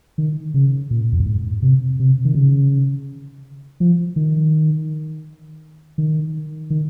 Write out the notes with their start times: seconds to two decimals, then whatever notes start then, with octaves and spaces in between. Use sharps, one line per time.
0.18 D#3
0.54 C#3
0.91 A#2
1.12 F2
1.20 G2
1.26 G#2
1.62 C3
2.00 C3
2.25 D#3
2.35 C#3
3.80 F3
4.16 D#3
5.98 D#3
6.70 D#3